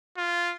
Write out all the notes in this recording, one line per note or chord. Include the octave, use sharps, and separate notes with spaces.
F4